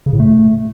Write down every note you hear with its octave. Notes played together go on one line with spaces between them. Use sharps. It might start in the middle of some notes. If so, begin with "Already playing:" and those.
C#3
A2
A3